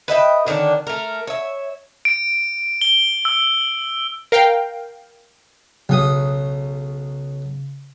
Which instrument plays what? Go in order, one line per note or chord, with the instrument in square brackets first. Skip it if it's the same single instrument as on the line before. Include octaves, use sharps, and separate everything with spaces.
[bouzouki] B4 D#5 E5 G5
D3 D#3 C#4 D4
A3 A#4
C#5 E5
[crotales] D7
G7
E6
[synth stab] A#4 F5 G5
[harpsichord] B1 F#3 D#6 [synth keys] C#3